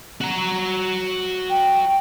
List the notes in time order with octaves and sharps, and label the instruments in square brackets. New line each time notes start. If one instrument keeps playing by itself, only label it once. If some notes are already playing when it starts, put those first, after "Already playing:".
[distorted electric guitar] F#4 A#5
[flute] G5